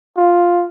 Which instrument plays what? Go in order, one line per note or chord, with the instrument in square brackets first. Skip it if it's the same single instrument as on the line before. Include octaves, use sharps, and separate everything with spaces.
[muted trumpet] F4